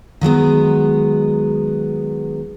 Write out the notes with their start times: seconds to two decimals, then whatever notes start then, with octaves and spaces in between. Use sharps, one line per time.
0.21 D#3 F#3 G#3 B3